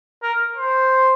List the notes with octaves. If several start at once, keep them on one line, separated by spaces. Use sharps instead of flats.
A#4
C5